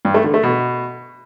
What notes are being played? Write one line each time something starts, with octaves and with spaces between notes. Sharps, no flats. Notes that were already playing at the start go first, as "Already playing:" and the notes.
G2
A3
D3
A3
B2